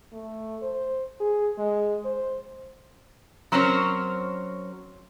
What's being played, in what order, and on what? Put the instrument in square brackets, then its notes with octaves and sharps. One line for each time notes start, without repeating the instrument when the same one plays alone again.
[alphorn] A3
C5
G#4
G#3
C5
[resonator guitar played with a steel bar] F#3 C4 C#4 A#4 C5 C#5